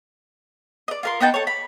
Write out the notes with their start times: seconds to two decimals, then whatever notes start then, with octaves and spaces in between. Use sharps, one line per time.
0.88 D5 D#5
1.03 F4 A#4 C6
1.20 B3 D#4 G5 A5
1.34 A4 C#5
1.47 B5